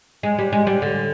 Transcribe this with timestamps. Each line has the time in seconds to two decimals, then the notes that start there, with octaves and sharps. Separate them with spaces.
0.23 G#3
0.39 G3
0.53 G#3
0.67 G3
0.82 D3